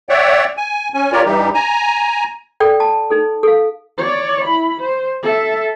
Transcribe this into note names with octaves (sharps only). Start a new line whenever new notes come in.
C#5 D5 E5 F#5 G5
G#5
C#4 G#5
F4 G4 A#4 C#5 D5
G2 E3 G3 D#4 G4
G#5 A#5
A4 D5 G5
A5
D#4 A4
A4 F5
C#5 D5
E4 B5
C5
A4 E5